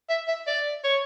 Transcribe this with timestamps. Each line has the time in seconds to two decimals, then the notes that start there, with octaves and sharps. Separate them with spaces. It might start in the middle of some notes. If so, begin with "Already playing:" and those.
0.10 E5
0.28 E5
0.47 D5
0.84 C#5